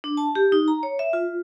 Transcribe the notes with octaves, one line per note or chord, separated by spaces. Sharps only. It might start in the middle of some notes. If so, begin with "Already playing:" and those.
D4
A5
G4
D#4
A#5
C#5
E5
F4